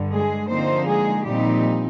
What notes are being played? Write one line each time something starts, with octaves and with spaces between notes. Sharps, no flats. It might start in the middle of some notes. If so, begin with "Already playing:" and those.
Already playing: G2 D3
G#3 G#4
D3 F3 A#3 C4 D#4 C5
G#3 G#4
A#2 F3 G3 C4 D#4 G4